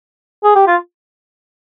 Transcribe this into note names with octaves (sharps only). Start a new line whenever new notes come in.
G#4
G4
F4